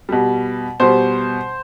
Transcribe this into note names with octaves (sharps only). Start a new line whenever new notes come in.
B2 G3
B2 G3 C5